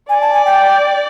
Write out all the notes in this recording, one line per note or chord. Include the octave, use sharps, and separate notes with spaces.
D5 G#5
A5
G#5
G5